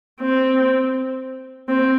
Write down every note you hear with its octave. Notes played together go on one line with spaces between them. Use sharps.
C4
C4